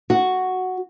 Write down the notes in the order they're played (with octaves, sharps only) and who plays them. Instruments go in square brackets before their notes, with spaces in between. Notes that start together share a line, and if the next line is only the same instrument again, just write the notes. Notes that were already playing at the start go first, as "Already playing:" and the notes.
[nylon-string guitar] F#4